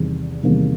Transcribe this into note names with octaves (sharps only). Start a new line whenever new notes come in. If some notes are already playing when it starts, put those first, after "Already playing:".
Already playing: E2 C3 D#3 G3
E2 C3 D#3 G3 A#3